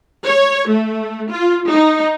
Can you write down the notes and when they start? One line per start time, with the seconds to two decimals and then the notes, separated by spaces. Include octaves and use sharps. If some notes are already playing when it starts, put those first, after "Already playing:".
0.25 C#5
0.67 A3
1.30 F4
1.68 D#4